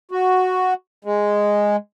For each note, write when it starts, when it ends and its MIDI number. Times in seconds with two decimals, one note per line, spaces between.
0.11 0.74 66
1.05 1.76 56